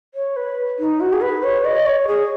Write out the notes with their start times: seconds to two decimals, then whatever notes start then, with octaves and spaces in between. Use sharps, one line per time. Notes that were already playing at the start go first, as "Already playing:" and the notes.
0.14 C#5
0.36 B4
0.79 D#4
1.01 F#4
1.13 G#4
1.21 B4
1.43 C#5
1.65 D#5
1.86 C#5
2.08 G#4